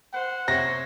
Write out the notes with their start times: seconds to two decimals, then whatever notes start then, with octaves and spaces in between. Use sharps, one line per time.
0.14 C5 F#5
0.48 C3 C5 C#5 A#6